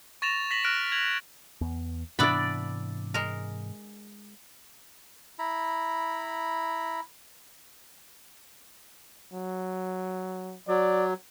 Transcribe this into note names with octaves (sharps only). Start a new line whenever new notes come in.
C#6 A6 A#6 E7 F7
A#6 B6 F#7
F6 F#6 A#6 D7
G#6 F7 F#7
E2 B3
G#2 C3 E3 B3 D4 E4 D5 B5
G#3 A#4
E4 A#5 B5
F#3
F#3 D5